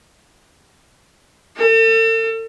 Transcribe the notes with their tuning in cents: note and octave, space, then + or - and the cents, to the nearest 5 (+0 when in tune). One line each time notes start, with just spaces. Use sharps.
A4 +40